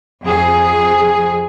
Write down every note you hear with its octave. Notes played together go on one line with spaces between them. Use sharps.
F2 G#4